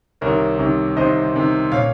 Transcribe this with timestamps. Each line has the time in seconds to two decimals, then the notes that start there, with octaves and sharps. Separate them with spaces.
0.21 C2 C3 D#3 A#4 C#5
0.59 C2 C3 D#3
0.96 C2 C3 D#3 C5 D#5
1.34 C2 C3 D#3
1.72 A#2 C#5 F5